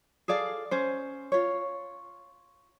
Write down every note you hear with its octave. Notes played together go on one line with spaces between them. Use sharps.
G#4 A4 D5 F5
C#4 C5
F4 C#5